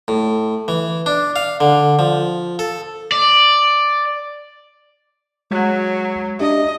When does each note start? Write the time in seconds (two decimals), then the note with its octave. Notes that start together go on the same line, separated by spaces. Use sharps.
0.08 A2
0.68 E3
1.06 D4
1.36 F5
1.60 D3
1.99 F3
2.59 A4
3.12 D5
5.51 F#3 G#3 F#5 F#6
6.39 D4 G4 D#5 E5